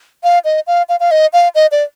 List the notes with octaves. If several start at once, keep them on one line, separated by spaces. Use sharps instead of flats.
F5
D#5
F5
F5
F5
D#5
F5
D#5
D5